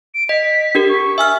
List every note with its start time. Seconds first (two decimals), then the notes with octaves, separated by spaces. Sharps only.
0.14 D7
0.29 D#5 B6
0.75 D4 G4 A#4
0.89 C#6
1.18 E5 G#5 E6 F6